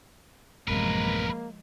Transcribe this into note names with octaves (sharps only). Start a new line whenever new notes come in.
A1 F#2 C3 F3 G#3 A#3 A#4 B4